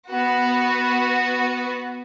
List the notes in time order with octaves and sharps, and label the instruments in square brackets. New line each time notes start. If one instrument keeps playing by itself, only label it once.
[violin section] B3 F#4